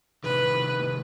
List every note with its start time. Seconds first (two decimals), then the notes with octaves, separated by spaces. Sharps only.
0.24 A2 C3 D#3 B4